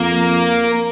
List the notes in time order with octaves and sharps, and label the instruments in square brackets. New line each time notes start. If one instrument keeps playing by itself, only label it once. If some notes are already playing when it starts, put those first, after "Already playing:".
Already playing: [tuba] F2 [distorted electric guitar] A#3